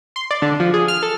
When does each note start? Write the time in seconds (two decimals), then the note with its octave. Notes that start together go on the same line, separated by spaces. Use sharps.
0.16 C6
0.31 D5
0.42 D3
0.60 F3
0.74 G#4
0.88 F6
1.03 A4